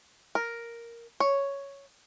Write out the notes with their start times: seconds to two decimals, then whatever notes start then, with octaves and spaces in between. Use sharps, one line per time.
0.35 A#4
1.20 C#5